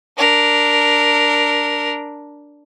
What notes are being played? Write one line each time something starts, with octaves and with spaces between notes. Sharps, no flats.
D4 A#4